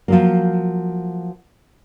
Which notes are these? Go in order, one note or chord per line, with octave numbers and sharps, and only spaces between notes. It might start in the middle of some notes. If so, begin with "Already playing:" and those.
F3 F#3 A#3